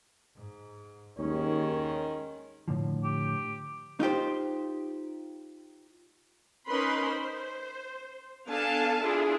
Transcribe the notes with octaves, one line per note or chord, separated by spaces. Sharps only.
G#2
D#2 D#3 G#3 C#4 C#5
A2 D3 F3
G4
D#4 F4 G4 C5
C#4 D#4 A#4 B4 B5 C6
C5
B3 D4 A4 F5 G#5 A5
D4 E4 F4 G#4